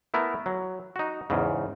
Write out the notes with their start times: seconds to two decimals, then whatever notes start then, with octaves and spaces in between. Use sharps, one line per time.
0.14 A3 B3 E4 A#4
0.46 F#3
0.96 D#4 F#4
1.30 E2 G#2 C#3